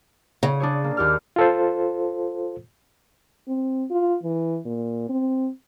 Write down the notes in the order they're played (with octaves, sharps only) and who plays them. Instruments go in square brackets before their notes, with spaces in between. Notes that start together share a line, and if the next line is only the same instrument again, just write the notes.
[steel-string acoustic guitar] C#3
[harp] D4 G#4 C#5
A#3
D#2 G4 F6
[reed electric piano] F4 A4 C5
[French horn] C4
F4
E3
A#2
C4